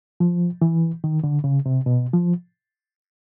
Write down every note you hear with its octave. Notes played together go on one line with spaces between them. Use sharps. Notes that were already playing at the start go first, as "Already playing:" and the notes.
F3
E3
D#3
D3
C#3
C3
B2
F3